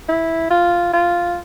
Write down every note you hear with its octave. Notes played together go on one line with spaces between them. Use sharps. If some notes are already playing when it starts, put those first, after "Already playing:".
E4
F4
F4